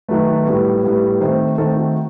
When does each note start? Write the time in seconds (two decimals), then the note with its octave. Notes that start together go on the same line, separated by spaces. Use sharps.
0.08 D#3 F#3 A3 B4
0.46 A2 G3 B3
0.84 A2 G3 B3
1.21 D#3 A3 C4 C5
1.58 D#3 A3 C4 A4
1.77 F#4